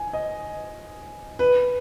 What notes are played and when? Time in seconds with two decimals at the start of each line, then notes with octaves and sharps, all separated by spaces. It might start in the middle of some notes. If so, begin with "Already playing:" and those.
Already playing: G#5
0.13 D#5
1.39 B4